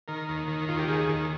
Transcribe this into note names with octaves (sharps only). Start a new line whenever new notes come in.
D#3 A#4
D#2
D#3
D#2 F4
G4
D#3 G#4
D#2